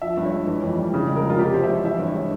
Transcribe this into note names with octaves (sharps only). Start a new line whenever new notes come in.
F3 E5
G2
C#5
G#3
E3
F2
G3
C#3
G#3
A#4
F3
F4
C3 G4
G#3 C5
E5
E3 C#5
E3 E5
G2
C#5
G#3